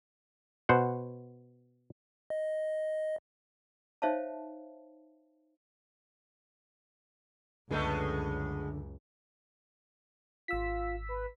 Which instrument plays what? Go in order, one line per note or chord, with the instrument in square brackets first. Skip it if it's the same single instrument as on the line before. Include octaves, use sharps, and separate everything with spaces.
[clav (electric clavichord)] B2 C5 F#5
[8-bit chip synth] D#5
[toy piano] D#4 C5 C#5 E5 F5 A5
[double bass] C#2 F#2 [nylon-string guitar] D3 B4 [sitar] G#3 A3 B3
[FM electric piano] G#1 E6 B6 [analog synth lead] F4
[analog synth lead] B4